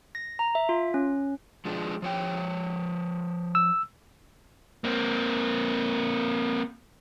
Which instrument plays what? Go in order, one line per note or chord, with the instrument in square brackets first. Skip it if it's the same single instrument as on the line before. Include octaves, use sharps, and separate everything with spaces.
[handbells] A#6
A#5
E5
F4
C#4
[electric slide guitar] F3 G#3 D4
F3 C#5 G5
[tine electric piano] E6
[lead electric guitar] A#3 C4